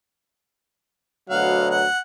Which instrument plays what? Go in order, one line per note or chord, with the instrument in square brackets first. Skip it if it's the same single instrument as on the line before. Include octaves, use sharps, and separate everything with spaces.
[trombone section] D2 B2 F#3 [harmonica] F5 F#5
[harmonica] F#5